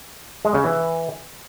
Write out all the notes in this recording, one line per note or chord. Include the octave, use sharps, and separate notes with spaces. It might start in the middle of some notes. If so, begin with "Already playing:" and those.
G#3
C#3
E3